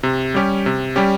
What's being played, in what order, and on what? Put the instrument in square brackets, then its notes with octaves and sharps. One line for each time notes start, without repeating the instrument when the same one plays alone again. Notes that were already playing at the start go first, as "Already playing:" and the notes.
[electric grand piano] C3
G3 C#4 G4
C3
G3 C#4 G4